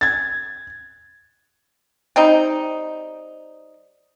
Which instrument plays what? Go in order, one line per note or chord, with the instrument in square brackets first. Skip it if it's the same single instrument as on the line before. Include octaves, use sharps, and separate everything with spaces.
[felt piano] G#6 A6
[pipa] G3 C4 D#4